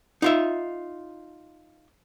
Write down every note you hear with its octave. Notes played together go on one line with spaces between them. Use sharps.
D#4 F4 E5